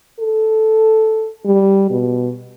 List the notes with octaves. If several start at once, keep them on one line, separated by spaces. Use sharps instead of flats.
A4
G3
B2